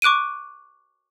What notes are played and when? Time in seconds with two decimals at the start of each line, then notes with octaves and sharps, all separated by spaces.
0.02 C#6 D6 F#6 D7 D#7